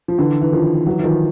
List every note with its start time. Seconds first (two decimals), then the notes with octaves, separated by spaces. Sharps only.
0.08 F3
0.18 D3 E3
0.41 E3
0.52 D#3 F3
0.86 E3 F#3
0.99 E3
1.03 D#3 F3